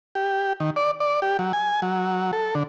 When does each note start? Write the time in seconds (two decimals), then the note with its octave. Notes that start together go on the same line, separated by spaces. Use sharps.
0.15 G4
0.60 D#3
0.76 D5
1.00 D5
1.22 G4
1.39 F#3
1.53 G#5
1.82 F#3
2.33 A4
2.55 D3